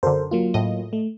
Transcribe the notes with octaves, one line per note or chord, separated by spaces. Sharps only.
F#2 D3 A4 A#4 C5
F#3 A#3 F4
A2 D#5
A3